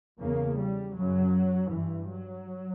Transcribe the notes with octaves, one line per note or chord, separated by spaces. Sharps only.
E2 C#3 A#3
G3
F#2 C#3 F#3
G2 E3
F#3